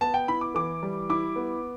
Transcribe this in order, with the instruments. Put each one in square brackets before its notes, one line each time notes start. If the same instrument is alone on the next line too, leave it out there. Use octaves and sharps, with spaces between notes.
[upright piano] B3 [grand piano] A5
[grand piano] G5
[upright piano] E4 [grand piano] B5
[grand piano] D6
[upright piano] E3 [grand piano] D6
[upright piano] G3
[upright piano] E4 [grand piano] D6
[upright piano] B3